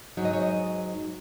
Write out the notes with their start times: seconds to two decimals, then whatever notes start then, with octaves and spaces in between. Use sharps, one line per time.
0.17 G#2 F#3 D#4
0.25 D#5
0.33 C#5
0.42 D#5